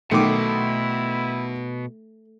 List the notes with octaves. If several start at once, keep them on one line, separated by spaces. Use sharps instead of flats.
B1 B2 D#3 A3 E4 D6